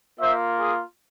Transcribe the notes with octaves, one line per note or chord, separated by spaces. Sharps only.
A#3 F4 C5 E5
G#4